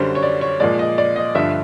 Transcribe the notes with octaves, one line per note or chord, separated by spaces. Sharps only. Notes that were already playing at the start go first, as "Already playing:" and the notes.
Already playing: F#2 D3 G3 C5
C#5
D5
C#5
A#2 F3 G#3 D5
D#5
D5
D#5
G2 D3 F3 E5